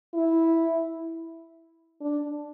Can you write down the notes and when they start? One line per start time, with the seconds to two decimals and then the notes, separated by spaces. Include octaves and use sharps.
0.14 E4
2.01 D4